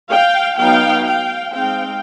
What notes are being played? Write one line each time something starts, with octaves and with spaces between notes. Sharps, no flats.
F5 G5
F#3 B3 D#4 F5 G5
F5 G5
G#3 C4 D#4 F5 G5